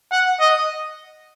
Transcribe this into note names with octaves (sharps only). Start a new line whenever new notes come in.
F#5
D#5